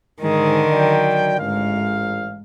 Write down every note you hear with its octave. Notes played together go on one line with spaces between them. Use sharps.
G#2 D3 D#3 G#4
F#3 D5 G5
A1 G#2 F5